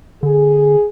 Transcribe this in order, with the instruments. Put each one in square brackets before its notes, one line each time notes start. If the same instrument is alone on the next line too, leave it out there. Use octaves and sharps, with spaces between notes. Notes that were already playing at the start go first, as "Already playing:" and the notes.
[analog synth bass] D3 [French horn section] G#4